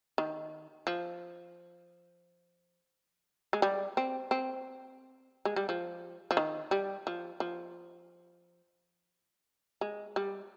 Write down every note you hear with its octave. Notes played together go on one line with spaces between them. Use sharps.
D#3
F3
G#3
G3
C4
C4
G#3
G3
F3
F3
D#3
G3
F3
F3
G#3
G3